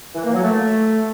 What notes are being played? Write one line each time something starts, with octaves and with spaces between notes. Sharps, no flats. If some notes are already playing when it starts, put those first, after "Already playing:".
E3
A#3
F#3
A3